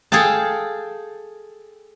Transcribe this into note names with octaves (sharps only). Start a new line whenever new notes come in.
G#4 A4 F5 G5 A5